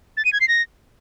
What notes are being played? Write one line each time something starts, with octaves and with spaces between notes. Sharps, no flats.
A6
D#7
G#6
C7
A#6